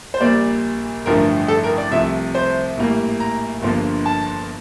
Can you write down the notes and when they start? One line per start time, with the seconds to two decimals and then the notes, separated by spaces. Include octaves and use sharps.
0.14 C5
0.20 A#1 A#2 G3 A#3 D5
1.06 A1 G2 D3 F3 A3 A#4
1.48 A4
1.64 A#4
1.78 D5
1.91 C2 C3 F3 A3 E5
2.35 C5
2.77 A#1 A2 G3 A#3
3.20 A#5
3.62 G1 G2 D3 F3 A#3
4.06 A5